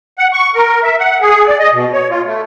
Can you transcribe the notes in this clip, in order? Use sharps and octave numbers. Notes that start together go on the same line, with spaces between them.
F#5
C#6
A#4
E5
F#5
G#4
D5
D#5
B2
C#5
F4
A3